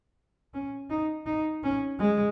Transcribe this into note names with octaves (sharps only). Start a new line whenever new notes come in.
C#4
D#4
D#4
C#4
G#3